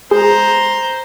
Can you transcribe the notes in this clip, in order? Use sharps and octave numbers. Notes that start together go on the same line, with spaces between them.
G#3 C5 A#5